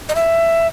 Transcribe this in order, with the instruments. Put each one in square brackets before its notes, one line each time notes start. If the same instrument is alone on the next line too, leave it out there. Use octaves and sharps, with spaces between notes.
[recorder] D#5
E5